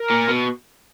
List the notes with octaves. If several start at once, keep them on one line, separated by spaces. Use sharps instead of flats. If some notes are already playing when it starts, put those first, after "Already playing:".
Already playing: A#4
A#2
B2